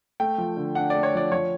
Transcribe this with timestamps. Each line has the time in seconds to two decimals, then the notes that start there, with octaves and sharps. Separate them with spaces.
0.20 A3 G5
0.38 F3
0.57 D3
0.75 D4 F#5
0.90 A3 D5
1.03 C#5
1.14 F3 D5
1.32 F3 C#5